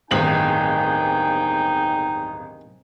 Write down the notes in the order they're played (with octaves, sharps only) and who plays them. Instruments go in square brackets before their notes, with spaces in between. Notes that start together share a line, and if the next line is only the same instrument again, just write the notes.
[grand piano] D1 G1 F#7 [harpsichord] C3 D#3 [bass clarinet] D#4 [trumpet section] G#4 G5